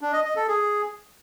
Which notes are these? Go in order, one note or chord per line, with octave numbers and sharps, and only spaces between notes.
D4
D#5
D#5
A4
G#4